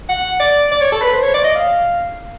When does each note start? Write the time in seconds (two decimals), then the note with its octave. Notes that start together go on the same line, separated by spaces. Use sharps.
0.09 F#5
0.40 D5
0.72 D5
0.81 C#5
0.92 A4
1.02 B4
1.13 C5
1.23 C#5
1.34 D5
1.44 D#5
1.55 F5